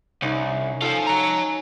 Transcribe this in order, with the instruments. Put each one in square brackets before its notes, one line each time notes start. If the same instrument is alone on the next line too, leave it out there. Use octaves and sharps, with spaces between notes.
[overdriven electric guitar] C2 [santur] C#4 D#4 D#5
[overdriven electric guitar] F4 C5 [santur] A4 G#5
[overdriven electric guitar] C#5 A#5